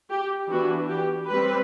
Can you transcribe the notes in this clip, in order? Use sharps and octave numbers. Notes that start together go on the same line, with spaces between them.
G4
E3 B3 D4 F#4
G4
G3 C4 B4